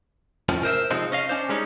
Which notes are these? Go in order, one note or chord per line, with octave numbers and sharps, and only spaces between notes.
C2 F2 A2 F3 C#4
A#4 C5 D#5 E5
C3 F3 G#3 C4 D#4
C#4 D#5 F5
C#4 D4 C5
G3 G#3 C#4 D#4